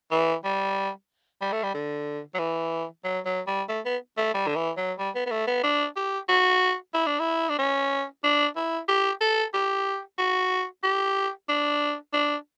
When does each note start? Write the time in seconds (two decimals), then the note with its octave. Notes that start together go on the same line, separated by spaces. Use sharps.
0.12 E3
0.44 G3
1.41 G3
1.52 A3
1.63 G3
1.74 D3
2.35 F#3
2.39 E3
3.04 F#3
3.26 F#3
3.47 G3
3.69 A3
3.85 B3
4.18 A3
4.34 G3
4.47 D3
4.56 E3
4.77 F#3
4.99 G3
5.15 B3
5.26 B3
5.31 A3
5.47 B3
5.63 D4
5.96 G4
6.28 F#4
6.94 E4
7.07 D4
7.19 E4
7.49 D4
7.59 C#4
8.24 D4
8.56 E4
8.89 G4
9.21 A4
9.54 G4
10.18 F#4
10.83 G4
11.49 D4
12.13 D4